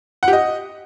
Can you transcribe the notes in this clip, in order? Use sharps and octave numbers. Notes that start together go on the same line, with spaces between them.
F#5
G4
D#5